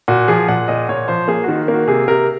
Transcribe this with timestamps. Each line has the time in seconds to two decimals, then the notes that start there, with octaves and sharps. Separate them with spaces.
0.08 A#2 F#4
0.28 F3 G#4
0.48 A#2 F#5
0.68 A#2 D#5
0.89 A#2 C#5
1.08 F3 C5
1.28 A#3 G#4
1.44 D#3 F#4
1.68 A#3
1.74 F#4
1.88 C3 G#4
2.08 C3 A#4